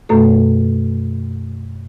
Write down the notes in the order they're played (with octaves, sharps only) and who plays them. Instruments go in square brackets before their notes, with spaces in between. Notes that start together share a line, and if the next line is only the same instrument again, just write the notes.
[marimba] F#2 B2 A3 A4